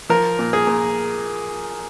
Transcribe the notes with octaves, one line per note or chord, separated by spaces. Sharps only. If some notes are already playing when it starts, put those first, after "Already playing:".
F3 A#4
A#2
G#4
A#2